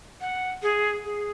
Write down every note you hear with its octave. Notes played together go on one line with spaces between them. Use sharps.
F#5
G#4
G#4